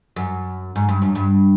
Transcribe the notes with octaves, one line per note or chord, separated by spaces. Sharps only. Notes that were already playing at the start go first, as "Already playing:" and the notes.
F#2
G#2
G2
F#2
G2